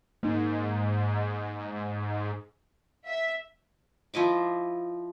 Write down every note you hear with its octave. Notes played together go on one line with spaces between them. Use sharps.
G#2 A#3 D#4
E5
F3 E4 D#5 D6